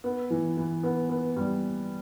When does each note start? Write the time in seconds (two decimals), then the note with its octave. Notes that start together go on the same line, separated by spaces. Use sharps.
0.04 B3
0.30 E3
0.57 E3
0.83 B3
1.09 B3
1.37 G3